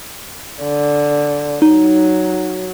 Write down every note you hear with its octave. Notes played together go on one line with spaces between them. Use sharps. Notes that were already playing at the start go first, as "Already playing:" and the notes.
D3
F#3 D#4